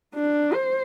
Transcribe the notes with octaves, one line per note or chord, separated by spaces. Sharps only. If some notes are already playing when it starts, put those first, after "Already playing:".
D4
C5